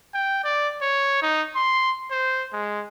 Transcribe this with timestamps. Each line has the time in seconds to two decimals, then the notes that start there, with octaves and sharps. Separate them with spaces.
0.14 G5
0.44 D5
0.82 C#5
1.22 D#4
1.55 C6
2.11 C5
2.53 G#3